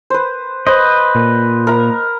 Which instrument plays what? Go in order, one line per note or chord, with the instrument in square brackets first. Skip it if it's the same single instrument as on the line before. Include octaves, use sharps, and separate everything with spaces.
[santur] B4 C5
[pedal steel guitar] B4 D#5 [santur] C5
[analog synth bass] A#2
[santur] A#4 A#5 B5